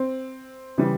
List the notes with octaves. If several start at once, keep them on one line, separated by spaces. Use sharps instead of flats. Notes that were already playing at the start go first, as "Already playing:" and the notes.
Already playing: C4
C#3 E3 G3